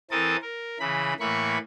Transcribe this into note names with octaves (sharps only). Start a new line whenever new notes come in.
E3 C4 A4 A#4 A5 D#6
A#4
C#3 E3 B5
A2 E3 A#3 B5 C#6